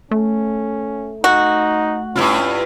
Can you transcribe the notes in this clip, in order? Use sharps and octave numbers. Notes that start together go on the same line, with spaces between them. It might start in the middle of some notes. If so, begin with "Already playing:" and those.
A3 C#4
D#4 F#4
G2 C#4 E4 F4